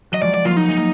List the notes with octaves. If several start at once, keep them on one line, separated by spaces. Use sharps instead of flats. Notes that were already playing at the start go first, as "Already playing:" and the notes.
F#3 D#5
F3 G#3 D5
D5
F#3 A#3 F4
D#4
G#3
A#3